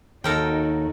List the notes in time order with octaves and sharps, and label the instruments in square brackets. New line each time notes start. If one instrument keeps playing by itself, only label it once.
[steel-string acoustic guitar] D#2 [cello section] D#4 F#4 [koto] A4 A#4 G5